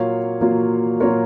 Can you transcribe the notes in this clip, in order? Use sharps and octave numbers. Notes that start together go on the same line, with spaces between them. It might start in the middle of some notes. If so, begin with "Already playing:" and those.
Already playing: A#2 F#3 A#3 F4 C#5 F5
A#2 F#3 A#3 F4
A#2 F#3 A#3 F4 A#4 C#5